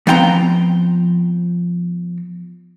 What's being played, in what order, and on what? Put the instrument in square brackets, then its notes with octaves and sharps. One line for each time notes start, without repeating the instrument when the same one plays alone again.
[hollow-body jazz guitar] F3 B3 C4 G5 G#5 A#5